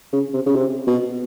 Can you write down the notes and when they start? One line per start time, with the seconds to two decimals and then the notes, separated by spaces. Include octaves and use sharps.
0.13 C#3
0.34 C3
0.46 C#3
0.55 C3
0.87 B2